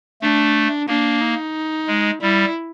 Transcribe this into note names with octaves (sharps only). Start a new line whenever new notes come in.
A3 D4
A#3 D4
D#4
G#3
G3 E4